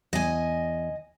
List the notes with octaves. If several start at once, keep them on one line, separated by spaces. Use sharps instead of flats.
E2 D#5 G#5